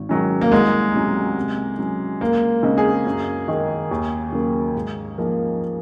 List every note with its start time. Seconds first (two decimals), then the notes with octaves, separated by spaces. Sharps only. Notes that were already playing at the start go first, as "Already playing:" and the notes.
Already playing: G#1
0.09 G#2 D#3 F#3 C#4
0.41 A#3
0.51 C2 G#3
0.94 C3 F#3 C#4
1.37 C3
1.78 F#3 C#4
2.21 C#2 A#3
2.63 C#3 G#3 C4 D#4
2.78 G#4
3.06 F#2
3.48 D#3 G#3
3.91 D#2
4.32 C#3 F#3 A#3
4.75 G#2
5.18 F3 A#3 D#4 G#4